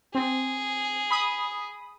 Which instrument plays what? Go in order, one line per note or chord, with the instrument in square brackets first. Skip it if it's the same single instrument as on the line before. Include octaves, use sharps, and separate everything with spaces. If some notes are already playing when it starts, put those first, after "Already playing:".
[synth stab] C4 [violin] G#4
[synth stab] B5 D#6